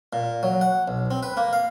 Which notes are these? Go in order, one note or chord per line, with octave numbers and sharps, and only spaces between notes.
A#2
F#3
F#5
B1
C4
B4
A#3
F5